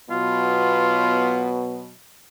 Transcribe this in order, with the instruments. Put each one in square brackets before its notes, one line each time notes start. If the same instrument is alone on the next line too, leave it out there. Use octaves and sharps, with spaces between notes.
[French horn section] B2 F#3 B3 [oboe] F4